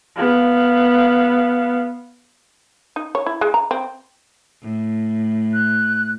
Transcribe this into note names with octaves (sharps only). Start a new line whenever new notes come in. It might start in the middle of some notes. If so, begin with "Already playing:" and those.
B3 F5
D#4
C#5
E4
G#3
A#5
C4
A2
F#6